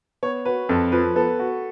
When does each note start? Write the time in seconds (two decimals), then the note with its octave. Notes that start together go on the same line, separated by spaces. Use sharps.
0.23 B3 C#5
0.45 F#4 B4
0.69 F2 A4
0.92 F3 B4
1.15 B3 A4
1.39 F#4